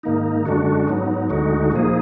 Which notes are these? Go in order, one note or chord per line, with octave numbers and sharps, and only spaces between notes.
G#2 D#3 A#3 D#4
F#2 D3 G#3 D4 F#4
G#2 F#3 B3 D#4
D2 D3 G#3 D#4 F#4
A#2 F3 A#3 D#4 G#4